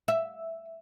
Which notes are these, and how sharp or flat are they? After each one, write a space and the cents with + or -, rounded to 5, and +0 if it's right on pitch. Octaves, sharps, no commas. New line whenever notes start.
E5 +0